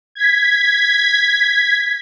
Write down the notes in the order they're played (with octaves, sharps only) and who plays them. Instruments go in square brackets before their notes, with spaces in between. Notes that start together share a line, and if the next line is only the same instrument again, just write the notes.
[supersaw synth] G#6 B6